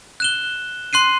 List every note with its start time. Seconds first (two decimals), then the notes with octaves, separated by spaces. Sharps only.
0.20 F#6 E7 G7
0.93 C6 F#6 C7 D#7